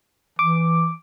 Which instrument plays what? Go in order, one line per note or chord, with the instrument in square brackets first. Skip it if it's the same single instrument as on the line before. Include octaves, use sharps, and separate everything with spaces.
[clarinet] E3 [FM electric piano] D6